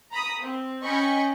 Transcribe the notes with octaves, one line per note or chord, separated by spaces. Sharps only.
A#5 B5 D#6
C4
C#4 D#5 G5 B5 C#6